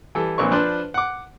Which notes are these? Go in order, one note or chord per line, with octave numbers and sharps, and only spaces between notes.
E3 G3 A4
A#1 A#2 C4 B4 C#5 C#6
F3 D4 B4 C5
F#5 D6